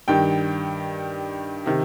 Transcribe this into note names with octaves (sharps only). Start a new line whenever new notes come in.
G2 D#3 G5
C3 D#3